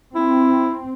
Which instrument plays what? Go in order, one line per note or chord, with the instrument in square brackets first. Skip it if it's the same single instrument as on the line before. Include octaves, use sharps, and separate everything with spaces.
[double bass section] C4 [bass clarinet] E4